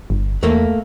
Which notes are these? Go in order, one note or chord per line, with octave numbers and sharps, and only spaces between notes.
G1
E2 A3 A#3